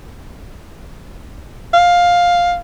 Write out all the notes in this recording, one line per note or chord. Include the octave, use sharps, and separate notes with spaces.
F5